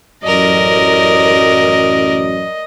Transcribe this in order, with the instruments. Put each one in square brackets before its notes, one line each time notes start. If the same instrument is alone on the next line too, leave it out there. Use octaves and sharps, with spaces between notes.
[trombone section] A1 F#2 [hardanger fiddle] A#4 D5 [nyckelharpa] D#5